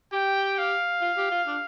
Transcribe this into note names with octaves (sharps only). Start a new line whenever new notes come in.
G4 G5
F5
F4
G4
F4
D4